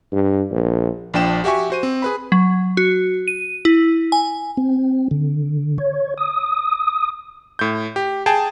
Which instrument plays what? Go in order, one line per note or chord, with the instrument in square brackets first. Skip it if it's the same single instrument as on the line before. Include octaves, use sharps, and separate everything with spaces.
[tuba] G2
A#1
[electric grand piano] A#1 F3 D4 G5 E7
F#4 G4 E5 G#5 C#6
F#4 C5 D#7
C4
G#4 B4 B5
[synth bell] F#3
F#4
D#7
E4
G#5
[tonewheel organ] C4
D3
C#5
D#6
[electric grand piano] A2 G6
G4
G#4 G5 A5